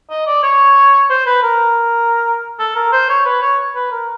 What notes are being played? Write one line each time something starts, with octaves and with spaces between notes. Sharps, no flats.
D#5
D5
C#5
C5
B4
A#4
A4
A#4
C5
C#5
B4
C#5
B4
A#4